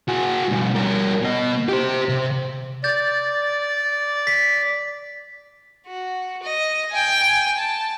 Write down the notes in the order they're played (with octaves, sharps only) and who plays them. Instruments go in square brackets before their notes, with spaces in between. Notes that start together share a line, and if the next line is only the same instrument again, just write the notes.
[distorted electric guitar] F#4 G#4
G2 B2
G2 A#4
B2 D#5
G4 C5
C3
[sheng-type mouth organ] D5 [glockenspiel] G6 A6
[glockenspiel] B6
[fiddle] F#4
D#5
G5 G#5
A5